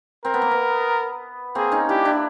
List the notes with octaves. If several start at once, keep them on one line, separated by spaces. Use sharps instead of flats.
C4 A#4
B3
A#3
B3
A#3 C4 G#4
C#4 D#4
D4 E4 G4
D4 E4